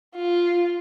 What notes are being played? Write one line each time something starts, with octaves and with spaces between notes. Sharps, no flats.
F4